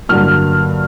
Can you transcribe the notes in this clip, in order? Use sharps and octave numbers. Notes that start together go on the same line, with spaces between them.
G2 D3 F#3 A#3 F6